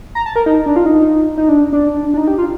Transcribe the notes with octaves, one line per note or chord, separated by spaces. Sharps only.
A#5
A5
A#4
D#4
D4
F4
D#4
D#4
D4
D4
D4
D#4
G4
F4